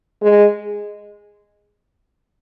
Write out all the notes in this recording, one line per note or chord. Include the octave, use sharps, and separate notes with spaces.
G#3